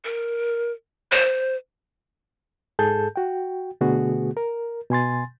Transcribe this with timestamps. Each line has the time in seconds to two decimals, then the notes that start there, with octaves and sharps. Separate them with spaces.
0.04 A#4
1.12 C5
2.79 G#2 G#4 A4 A5 G6
3.16 F#4 G5
3.81 B2 D3 A3 B3 F#4 G#4
4.37 A#4
4.90 B2 G#5 C6 A6